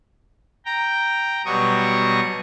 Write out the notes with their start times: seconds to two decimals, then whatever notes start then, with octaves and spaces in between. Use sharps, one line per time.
0.66 G5 A#5
1.45 B2 F#3 G3 C#6 D#6